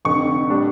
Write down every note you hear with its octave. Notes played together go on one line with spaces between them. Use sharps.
F1 F2 D3 C#6
A2 G3 D4